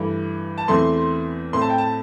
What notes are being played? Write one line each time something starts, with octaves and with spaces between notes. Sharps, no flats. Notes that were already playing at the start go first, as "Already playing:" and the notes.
Already playing: G2 E3 A3
A5
E2 E3 A3 C4 C6
A2 A3 C4 C6
A5
G5
A5